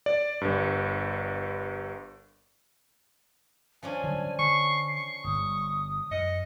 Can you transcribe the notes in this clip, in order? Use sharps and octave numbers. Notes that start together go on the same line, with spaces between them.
D5
G1 G2
F3 C#4 D4 G#5
D3 F#3 G3
D3 C#6 C7
C#6
G1 G2 D#6
F#2 D#5 C#7